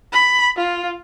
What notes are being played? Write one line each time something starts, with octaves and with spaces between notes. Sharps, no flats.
B5
F4